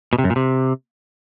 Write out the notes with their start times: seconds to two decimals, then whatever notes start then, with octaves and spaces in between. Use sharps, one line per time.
0.13 B2
0.18 C3
0.24 F#2
0.30 A#2
0.36 C3